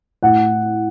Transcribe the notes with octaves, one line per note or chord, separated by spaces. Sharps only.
A2 F#5